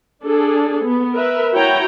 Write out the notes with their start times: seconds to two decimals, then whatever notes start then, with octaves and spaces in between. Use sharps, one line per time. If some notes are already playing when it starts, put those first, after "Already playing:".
0.24 D4 G#4 A4
0.84 B3
1.13 A#4 B4 E5
1.54 E4 F#4 C#5 G5 A#5